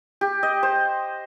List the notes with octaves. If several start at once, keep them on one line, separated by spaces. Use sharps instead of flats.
G4
D#5
C5